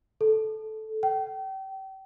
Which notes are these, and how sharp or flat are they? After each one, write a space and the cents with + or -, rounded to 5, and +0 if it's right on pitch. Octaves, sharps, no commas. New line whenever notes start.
A4 -10
G5 -35